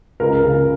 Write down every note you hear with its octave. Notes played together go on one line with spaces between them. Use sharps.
C#2 A#4
C#3